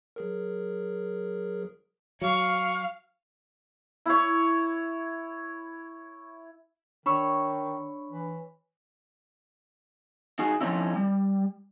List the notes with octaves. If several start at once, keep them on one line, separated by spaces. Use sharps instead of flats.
F#3 G#4 A#4
F#3 F5 C#6
E4 C#5
D#3 D4 C#5 B5 C#6 E6
E3
D#4 F#4 G#4
F3 A3 C4 C#4 D#4 E4
G3